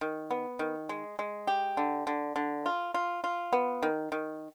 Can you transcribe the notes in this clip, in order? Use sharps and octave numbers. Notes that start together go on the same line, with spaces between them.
D#3
B3
D#3
G#3
G#3
G4
D3
D3
D3
F4
F4
F4
B3
D#3
D#3